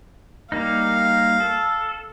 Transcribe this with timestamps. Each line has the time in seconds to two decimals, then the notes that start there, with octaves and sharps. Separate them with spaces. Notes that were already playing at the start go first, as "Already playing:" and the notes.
0.52 G3 A#3 D#4 F5
1.40 A4